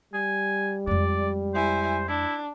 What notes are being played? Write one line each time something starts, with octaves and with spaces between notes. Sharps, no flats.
G3 G#5
F2 G#3 D5
E4 C5 G#5
D4 E4